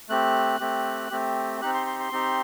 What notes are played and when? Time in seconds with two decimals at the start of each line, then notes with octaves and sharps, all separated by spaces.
0.09 A3 C4 G4 F#6
0.60 A3 C4 G4
1.11 A3 C4 G4
1.61 C4 D#4 G4 F#6
1.74 C6
1.87 C6
1.99 C6
2.12 C4 D#4 G4